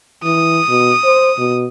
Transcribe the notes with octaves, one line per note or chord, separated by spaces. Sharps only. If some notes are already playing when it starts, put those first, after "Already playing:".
E3 D#6
B2
C5
B2